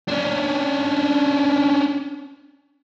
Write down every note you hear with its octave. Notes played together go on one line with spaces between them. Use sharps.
C#4 D4